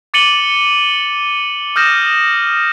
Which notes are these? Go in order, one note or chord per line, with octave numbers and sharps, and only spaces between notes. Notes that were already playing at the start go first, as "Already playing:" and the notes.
D6 A6 C#7 D#7 F#7 G7
D#6 F6 G6 A#6 E7